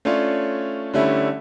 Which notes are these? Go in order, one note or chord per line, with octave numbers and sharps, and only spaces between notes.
A3 C#4 D4 F4 C#5
D3 G3 A3 C#4 E4